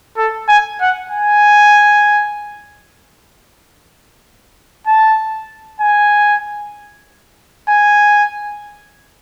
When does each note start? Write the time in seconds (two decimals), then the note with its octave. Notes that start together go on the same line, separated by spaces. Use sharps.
0.17 A4
0.49 G#5
0.81 F#5
1.11 G#5
4.87 A5
5.81 G#5
7.69 G#5